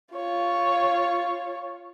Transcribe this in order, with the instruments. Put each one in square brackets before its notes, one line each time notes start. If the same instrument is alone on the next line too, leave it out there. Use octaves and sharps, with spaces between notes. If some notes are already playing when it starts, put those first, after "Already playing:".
[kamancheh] F4 C#5